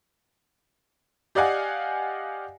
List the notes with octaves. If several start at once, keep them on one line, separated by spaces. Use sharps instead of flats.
G4 D5 D#5 F5 F#5 G#5